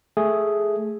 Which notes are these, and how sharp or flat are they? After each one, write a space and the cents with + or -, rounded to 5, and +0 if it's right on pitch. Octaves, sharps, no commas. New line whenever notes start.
A3 -5 G#4 +0